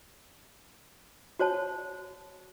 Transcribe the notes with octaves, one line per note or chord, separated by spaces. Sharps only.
F#4 C5 C#5 A5